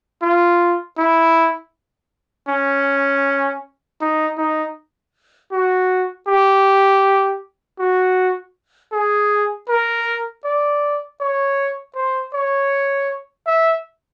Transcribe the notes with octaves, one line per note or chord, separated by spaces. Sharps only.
F4
E4
C#4
D#4
D#4
F#4
G4
F#4
G#4
A#4
D5
C#5
C5
C#5
E5